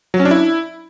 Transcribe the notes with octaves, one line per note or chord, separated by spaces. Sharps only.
F#3
C#4
D4
E4